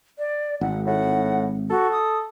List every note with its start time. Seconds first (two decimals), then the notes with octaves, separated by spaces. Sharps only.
0.18 D5
0.61 G#1 F#5
0.86 A2 F#5
1.70 F#4 A4
1.92 D#6